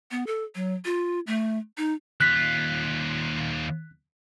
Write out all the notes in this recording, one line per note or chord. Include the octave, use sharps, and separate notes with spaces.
B3
A4
F#3
F4
A3
D#4
D#2 F4 F#6 B6